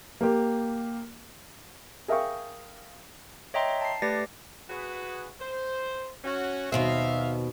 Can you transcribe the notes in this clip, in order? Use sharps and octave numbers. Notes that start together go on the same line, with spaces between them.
A#3 G4
G#4 A#4 E5 F5 G5 C#6
C#5 D#5 E5 G5 A#5 C6
A5 C7
A3 G4 B4 D5 A6 A#6
F#4 G#4 B4
C5
C#4 F#4
D#2 B2 C4 E5 F5